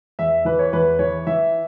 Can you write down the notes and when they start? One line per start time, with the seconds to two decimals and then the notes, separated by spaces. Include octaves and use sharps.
0.19 E2 E5
0.45 E3 B4
0.59 C#5
0.73 E2 B4
0.99 E3 C#5
1.27 E3 E5